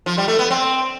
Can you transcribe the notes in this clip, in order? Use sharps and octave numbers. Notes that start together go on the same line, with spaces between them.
F3
G3
A3
B3
C4